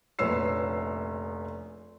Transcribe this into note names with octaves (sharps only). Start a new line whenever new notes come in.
F1 A#1 B4 C#5 E6 C7